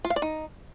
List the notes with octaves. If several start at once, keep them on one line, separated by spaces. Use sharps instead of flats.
F4
F5
D5
D#4